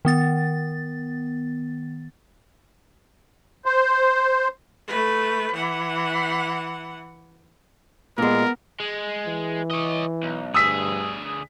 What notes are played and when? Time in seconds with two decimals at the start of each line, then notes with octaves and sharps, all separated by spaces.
0.05 D#3 B3 A6
3.65 C5
4.88 A3 B4
5.55 E3 F#5
8.18 A#2 G#3 B3 A#4
8.80 G#3
9.26 E3
9.71 C#5 D#5
10.23 B1
10.54 D2 G2 G#4 D#6 E6 B6